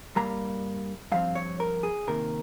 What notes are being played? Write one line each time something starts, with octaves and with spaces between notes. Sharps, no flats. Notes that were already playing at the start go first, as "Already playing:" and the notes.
G2 G3 A#3 A#5
G2 F3 C4 F5
C#5
A#4
G#4
C3 D#3 A#3 A#4